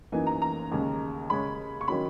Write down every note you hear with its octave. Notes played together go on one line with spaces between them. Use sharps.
F#2 E3 A#3 D#4 G#5
A#5
A#5
D#2 C#3 G#3
C#3 G#3 C#4 B5
C#6
D#3 F#3 C#4 B5